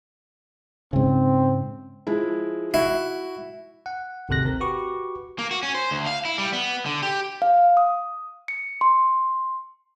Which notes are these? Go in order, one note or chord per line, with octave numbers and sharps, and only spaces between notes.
G#2 C#3 C4
F3 G#3 E4
E4 F#4
F#5
G#1 D2 C3 A4 F#6 A#6
C4 A#4
F#4 G4 B4 C#6 D6
A#3
F#4
C#4
C5
D2
F5
E4
G3
B3
D3
G4
F5
D#6
C#7
C6